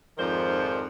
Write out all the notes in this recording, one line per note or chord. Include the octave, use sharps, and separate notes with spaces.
F2 G#2 D#3 F3 C5 D5